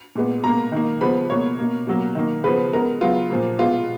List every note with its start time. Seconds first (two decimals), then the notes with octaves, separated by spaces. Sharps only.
0.15 A#2 G#3 B3
0.44 B2 A#3 A#5
0.72 D#3 A#3
1.01 C#3 F3 G#3 B3 B5
1.29 B2 A#3 C#5
1.58 B2 A#3
1.87 B2 F#3 A#3
2.15 D#3 A#3
2.44 C#3 F3 B3 B4
2.73 C#3 G#3 B3 A#4
3.01 C#3 F#3 B3 F4
3.30 A#2 F3 A#3
3.59 B2 G#3 B3 F4